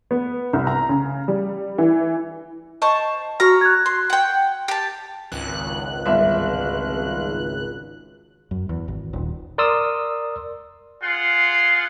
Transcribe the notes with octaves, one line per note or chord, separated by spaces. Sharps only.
B3
C2
A#5
C#3
G3
E3
C5 D#5 A5 C#6
F#4 C#5 A#5 F6
F#6 G#6
C6
F#5 G5
G4 A5
G#1 C#2 F#6
G1 E5
F#2
E2
G#1
D#1
A#4 D5 C6 D#6 E6
F4 G#4 F#5 C6